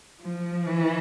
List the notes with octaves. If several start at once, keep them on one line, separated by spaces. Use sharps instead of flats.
F3
E3